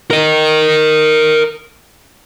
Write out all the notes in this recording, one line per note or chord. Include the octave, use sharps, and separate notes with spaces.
A#4 D#5